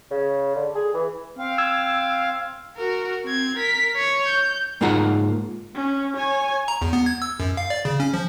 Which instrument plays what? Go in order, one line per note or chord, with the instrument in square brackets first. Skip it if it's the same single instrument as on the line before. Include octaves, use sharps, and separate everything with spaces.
[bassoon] C#3
D3
G#4
E3
[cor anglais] C4 [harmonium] F5
[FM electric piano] E6 G#6
[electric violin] F#4 A#4
C4 G#6
A#4 B6
C#5
G6
[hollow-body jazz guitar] G#2 A#3 D#4 F4 F#5 A#5
[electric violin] C#4
C#5 G#5
[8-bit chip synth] A#5
E2
B3
G#6
E6
F#2
F5
D5
C#3
C#4
F3